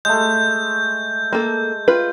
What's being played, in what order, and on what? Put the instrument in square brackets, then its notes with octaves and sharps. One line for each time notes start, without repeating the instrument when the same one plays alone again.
[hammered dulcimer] G#3 A3 [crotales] G6
[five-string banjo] A#3 A4
F4 B4